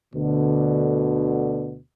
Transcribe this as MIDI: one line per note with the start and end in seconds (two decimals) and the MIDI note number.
0.15 1.79 38
0.15 1.79 47
0.15 1.79 50